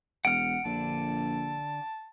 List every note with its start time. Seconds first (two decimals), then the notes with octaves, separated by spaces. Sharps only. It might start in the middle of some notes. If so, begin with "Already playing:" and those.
0.25 E1 F#5 F6 D7
0.65 A#1 D3 A5